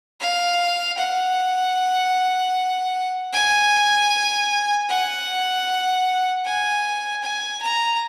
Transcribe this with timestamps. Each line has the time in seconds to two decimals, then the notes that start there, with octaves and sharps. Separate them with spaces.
0.21 F5
0.98 F#5
3.33 G#5
4.89 F#5
6.45 G#5
7.23 G#5
7.62 A#5